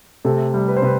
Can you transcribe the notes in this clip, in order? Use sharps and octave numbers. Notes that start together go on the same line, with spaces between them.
C3 A3 A4
G3
B4
C5
C3 B4